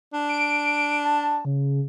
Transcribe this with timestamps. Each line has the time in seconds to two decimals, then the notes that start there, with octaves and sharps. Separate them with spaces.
0.13 D4
0.29 D7
1.05 A5
1.45 C#3